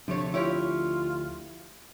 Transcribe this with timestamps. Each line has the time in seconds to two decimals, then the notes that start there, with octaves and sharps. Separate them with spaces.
0.08 D2 C3 F3 A3 D4 C#5
0.34 E4 F4 G4 C#5